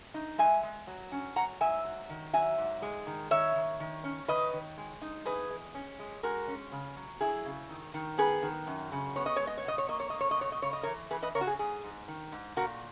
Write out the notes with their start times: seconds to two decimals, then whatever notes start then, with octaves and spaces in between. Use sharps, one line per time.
0.14 D#4
0.38 G#3 E5 G#5
0.63 G#3
0.87 F#3
1.12 C#4
1.36 F#3 F#5 A#5
1.60 G#2 E5 G#5
1.85 F#3
2.09 D#3
2.34 F#3 E5 G#5
2.58 G#2
2.82 G#3
3.07 D#3
3.31 D#3 C#5 E5
3.55 D#3
3.80 D#3
4.04 C#4
4.28 D#3 B4 D#5
4.53 D#3
4.78 G#3
5.02 D#4
5.25 E2 G#4 B4
5.50 G#3
5.75 C#4
5.99 G#3
6.23 G#3 F#4 A#4
6.48 C#4
6.72 C#3
6.96 F#3
7.21 E4 G#4
7.45 C#3
7.69 D#3
7.94 D#3
8.18 B3 G#4 B4
8.42 D#3
8.67 F#2
8.92 C#3
9.16 B3 C#5
9.26 D#5
9.36 G#3 C#5
9.47 D#5
9.58 C#5
9.65 B2 D#5
9.78 C#5
9.89 A#3 D#5
10.00 C#5
10.10 A#3 D#5
10.21 C#5
10.31 D#5
10.37 B2 C#5
10.52 D#5
10.62 C#3 C#5
10.73 D#5
10.83 E3 A#4 C#5
11.10 E3 G#4 B4
11.23 B4 D#5
11.35 C#3 A#4 C#5
11.41 F#4
11.47 G#4
11.59 G#2 G#4
11.84 G#2
12.08 D#3
12.32 G#2
12.56 A#2 F#4 A#4